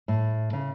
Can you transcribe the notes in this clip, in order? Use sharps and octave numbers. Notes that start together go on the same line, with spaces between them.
A2
C#3